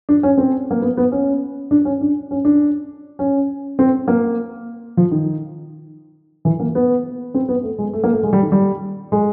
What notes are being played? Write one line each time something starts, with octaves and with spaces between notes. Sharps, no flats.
D4
C#4
C4
A#3
B3
B3
C#4
D4
C#4
D4
C#4
D4
C#4
C4
A#3
F3
D#3
E3
A#3
B3
C4
B3
A3
G#3
A3
A#3
A3
G#3
G3
D#3
G3
G#3